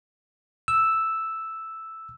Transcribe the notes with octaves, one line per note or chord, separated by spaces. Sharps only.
E6